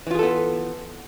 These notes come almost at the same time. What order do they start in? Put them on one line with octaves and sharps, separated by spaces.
E3 F4 G#4 A4 B3